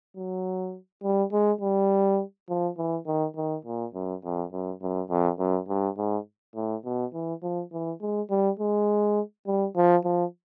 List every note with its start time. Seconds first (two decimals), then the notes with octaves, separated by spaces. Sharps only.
0.17 F#3
1.03 G3
1.32 G#3
1.61 G3
2.49 F3
2.78 E3
3.06 D#3
3.36 D#3
3.65 A#2
3.94 F#2
4.24 F2
4.52 F#2
4.81 F#2
5.10 F2
5.39 F#2
5.68 G2
5.97 G#2
6.55 A2
6.85 B2
7.14 E3
7.43 F3
7.72 E3
8.01 G#3
8.30 G3
8.60 G#3
9.47 G3
9.76 F3
10.04 F3